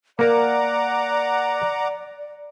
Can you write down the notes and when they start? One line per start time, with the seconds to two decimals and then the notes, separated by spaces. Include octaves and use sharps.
0.19 A#3 A#4 D5 F#5 A#5 D6